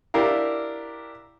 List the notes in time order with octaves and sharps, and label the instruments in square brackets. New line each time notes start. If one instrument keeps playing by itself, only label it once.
[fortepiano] D4 E4 G4 A#4 F5